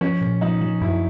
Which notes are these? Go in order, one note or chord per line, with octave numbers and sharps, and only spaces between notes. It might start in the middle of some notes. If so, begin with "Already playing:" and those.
F3 C#4
A#2
F3 D#4
F3
F#2 E4